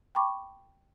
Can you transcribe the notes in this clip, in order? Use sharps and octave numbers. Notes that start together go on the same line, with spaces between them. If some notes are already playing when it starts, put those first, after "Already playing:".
G5 A5 B5 C#6 D6